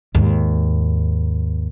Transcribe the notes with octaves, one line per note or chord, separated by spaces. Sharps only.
D#2 G#2